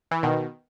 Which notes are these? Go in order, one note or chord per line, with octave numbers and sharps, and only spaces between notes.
E3
B2 D#3